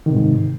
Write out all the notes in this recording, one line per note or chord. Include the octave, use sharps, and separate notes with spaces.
G#2 C3 D#3